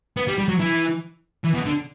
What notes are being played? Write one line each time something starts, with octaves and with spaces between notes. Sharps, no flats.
B3
G3
G3
F#3
E3
E3
B2
D3